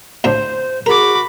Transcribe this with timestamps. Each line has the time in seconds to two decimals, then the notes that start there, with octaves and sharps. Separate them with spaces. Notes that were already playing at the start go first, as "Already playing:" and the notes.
0.24 D2 A2 D4 C5
0.86 F#4 G#4 A#4 B5 D6